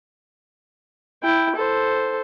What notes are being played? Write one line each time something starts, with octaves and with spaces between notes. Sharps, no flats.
E4 G5
A4 C5